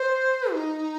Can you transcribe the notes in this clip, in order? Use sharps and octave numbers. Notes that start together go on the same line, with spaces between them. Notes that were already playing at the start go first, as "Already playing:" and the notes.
Already playing: C5
D#4